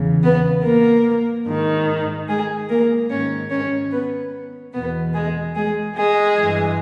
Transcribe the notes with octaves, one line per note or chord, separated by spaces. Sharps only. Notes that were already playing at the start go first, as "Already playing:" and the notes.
Already playing: E2 C#3 E3
B3 B4
A#3 A#4
G#2 D#3
G#3 G#4
A#3 A#4
G#2 D#3 C#4 C#5
C#4 C#5
B3 B4
E2 B2 B3 B4
G#3 G#4
G#3 G#4
G#3 G#4
G2 E3